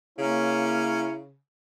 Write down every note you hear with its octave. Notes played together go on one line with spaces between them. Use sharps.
C#3 A#3 C#4 E4 A#4